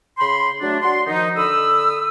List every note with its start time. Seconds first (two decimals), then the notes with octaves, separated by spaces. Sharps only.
0.18 C#3 B5 C6
0.60 F#3 A3 D4
0.81 F#4 D5 C6
1.06 D#3 F3 D#4
1.36 D3 B5 D#6 E6